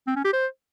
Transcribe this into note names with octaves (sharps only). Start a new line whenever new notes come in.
C4
C#4
G4
C5